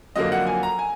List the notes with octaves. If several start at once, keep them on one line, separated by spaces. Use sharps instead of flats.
F2 D3 F#3 A#3 D#5
F#5
G#5
A#5
G#5